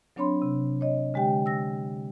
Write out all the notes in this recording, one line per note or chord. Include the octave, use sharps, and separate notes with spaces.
F#3 C4 D4 C#5 B5 C6
C3
C#5 D#5
D3 G#3 G4 G5
E6 A#6